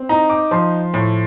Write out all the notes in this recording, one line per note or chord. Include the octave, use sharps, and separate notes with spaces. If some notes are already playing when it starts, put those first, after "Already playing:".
Already playing: C4
D#4 A#5
D6
F3 C6
A2